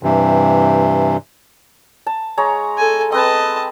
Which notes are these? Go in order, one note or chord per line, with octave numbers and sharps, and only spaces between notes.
G2 C3 E3
A5
G#3 C#5 A#5
A4 G#5
C4 B4 D#5 A5